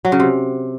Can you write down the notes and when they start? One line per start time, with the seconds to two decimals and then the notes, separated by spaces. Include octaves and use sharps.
0.05 F#3
0.12 C#3
0.20 C3